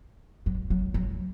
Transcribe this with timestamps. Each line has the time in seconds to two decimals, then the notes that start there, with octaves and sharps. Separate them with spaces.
0.46 F#3
0.70 F#3
0.94 F#3